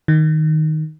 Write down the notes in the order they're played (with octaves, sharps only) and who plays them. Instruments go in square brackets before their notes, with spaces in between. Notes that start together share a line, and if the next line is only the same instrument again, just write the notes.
[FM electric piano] D#3